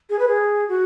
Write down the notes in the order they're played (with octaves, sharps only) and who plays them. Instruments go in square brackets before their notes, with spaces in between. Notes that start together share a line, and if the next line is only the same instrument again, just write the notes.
[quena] G#4
B4
G#4
F#4